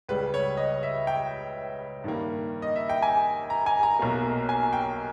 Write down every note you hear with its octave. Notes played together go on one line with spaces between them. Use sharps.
C#2 C#3 G3 B4
C#5
D#5
E5
G5
G2 D#3 G3 A#3
D#5
E5
G5
G#5
A#5
G#5
A#5
B1 B2 A#3
G#5
G5